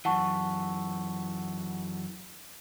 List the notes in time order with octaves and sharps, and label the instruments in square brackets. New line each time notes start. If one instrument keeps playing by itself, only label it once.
[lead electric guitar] F#2 E3 [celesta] F#5 A5 C#6